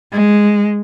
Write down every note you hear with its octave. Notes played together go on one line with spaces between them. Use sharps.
G#3